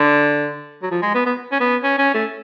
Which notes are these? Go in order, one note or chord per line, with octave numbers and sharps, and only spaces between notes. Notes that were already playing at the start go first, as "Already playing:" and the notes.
Already playing: D3
F#3
F3
G#3
B3
B3
C#4
B3
C#4
C#4
A3